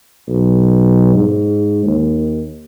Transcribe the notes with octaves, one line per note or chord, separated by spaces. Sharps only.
B1
G#2
D#2